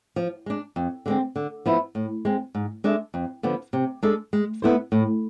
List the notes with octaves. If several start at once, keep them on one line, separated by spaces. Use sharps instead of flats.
F3
G#3 D4
F2
D3 G#3 C4
D3
F3 B3 E4
A2
G#3 C4
G#2
G#3 D4 A4 E5
F2
D3 F3 B3
C3
G#3 D4 A4
G#3
B3 E4 A4 C5
A2